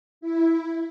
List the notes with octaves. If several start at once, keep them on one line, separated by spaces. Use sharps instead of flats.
E4